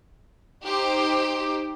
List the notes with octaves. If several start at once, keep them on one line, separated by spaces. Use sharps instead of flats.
D#4 G4 C5